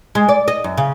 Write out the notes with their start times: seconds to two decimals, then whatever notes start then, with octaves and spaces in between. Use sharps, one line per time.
0.15 G#3
0.29 D5
0.48 D#5
0.64 F#2
0.77 C#3